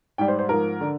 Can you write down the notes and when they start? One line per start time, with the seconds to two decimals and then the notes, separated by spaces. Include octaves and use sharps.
0.18 G#2 G3 G5
0.28 C5
0.39 C5
0.49 G#2 F3 A#4
0.81 D3